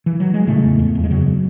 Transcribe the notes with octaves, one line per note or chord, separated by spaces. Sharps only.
E3
F#3
G#3
A2 C#3 A3
E2
E2
E2
G#3
F#2 C#3 F#3